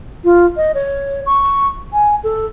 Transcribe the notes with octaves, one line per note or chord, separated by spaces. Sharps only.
F4
D#5
C#5
C#6
G#5
A4